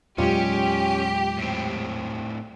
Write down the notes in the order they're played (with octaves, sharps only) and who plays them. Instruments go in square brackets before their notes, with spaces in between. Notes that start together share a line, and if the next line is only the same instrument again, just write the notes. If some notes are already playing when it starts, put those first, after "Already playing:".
[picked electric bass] E2 A#2 F#3 [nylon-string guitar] G#3 F4 F5 [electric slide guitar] C#4 [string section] G4
[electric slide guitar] A2 C4